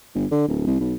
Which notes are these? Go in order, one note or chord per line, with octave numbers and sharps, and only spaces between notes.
G1
D3
D1
C2
B1